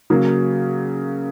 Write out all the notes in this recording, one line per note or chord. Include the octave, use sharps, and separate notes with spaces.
C#3 F#3 A#3